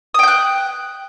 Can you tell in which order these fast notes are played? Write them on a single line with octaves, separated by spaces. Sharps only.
D#6 G5 G6 F#6